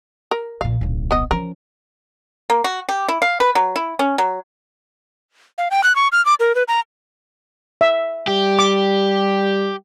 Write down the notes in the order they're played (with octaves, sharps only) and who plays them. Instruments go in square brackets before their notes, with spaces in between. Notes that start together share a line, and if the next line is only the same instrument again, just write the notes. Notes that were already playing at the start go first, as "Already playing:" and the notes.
[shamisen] A#4
[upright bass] A#1 A#2 [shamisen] F5
[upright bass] D1 B1
[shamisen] B3 D#5
[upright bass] F3 C#4 [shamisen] A#4
[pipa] A#3
F#4
G4
E4
F5
B4
F#3
E4
C#4
F#3
[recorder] F5
G5
F#6
C#6
F6
D6
A#4
B4
A#5
[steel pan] E5
[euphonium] G3 [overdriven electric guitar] G4
[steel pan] D6